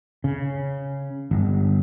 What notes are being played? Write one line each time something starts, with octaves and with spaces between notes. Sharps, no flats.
C#3
G1